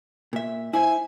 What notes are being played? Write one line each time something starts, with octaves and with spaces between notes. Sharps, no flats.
A#2 E5
E4 C5 E5 G#5